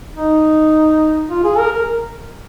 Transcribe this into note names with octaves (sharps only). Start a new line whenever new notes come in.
D#4
F4
G#4
A#4
A#4